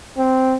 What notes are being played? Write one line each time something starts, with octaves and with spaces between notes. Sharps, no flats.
C4